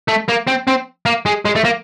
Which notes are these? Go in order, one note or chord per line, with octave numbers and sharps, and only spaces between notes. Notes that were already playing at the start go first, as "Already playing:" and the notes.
A3
A#3
C4
C4
A#3
G#3
G#3
A3
A#3